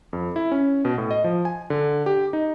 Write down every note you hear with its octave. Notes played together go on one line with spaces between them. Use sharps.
F2
E4
C#4
B2
A2
D#5
F3
G#5
D3
G4
D#4